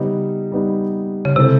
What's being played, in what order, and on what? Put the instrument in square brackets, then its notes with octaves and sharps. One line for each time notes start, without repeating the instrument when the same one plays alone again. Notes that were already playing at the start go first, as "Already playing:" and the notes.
Already playing: [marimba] C#3 [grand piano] G3 B3 D#4
[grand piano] G3 B3 D#4
[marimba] C#3
[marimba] C3 [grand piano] G#3 C4 E4 A4 C5